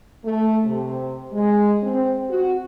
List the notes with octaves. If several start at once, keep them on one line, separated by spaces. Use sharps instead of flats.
A3
C3
G#3
C4
F#4